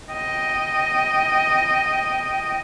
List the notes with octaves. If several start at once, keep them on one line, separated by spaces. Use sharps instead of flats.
D#5 G5